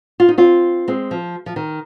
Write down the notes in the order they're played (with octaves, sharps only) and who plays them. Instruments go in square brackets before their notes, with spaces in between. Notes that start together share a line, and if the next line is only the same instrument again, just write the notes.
[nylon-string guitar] F4
D#4
C4 F4
G#3 C4
F3
F3
D#3